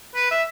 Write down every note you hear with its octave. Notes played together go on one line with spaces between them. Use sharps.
B4
E5